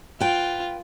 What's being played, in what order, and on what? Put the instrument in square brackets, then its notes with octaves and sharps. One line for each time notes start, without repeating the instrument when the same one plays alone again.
[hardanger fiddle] F4 [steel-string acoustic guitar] B4 G5